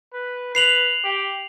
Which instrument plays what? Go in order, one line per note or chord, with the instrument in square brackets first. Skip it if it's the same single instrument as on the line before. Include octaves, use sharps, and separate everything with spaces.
[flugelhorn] B4
[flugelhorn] B4 [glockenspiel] C7 F7 F#7
[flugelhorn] G4